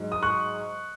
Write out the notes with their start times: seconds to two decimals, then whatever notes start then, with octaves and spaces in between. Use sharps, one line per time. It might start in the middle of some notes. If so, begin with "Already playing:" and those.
Already playing: G#2 F#3
0.12 D#6
0.23 C#6 F#6